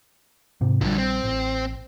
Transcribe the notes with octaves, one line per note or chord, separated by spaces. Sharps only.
G#2 C3
A#1 D3 F3 G3
C4
A1